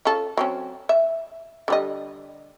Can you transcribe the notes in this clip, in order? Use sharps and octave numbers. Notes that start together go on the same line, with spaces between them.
C#4 F4 A4
F#3 C4 C#4
E5
D3 G3 D#5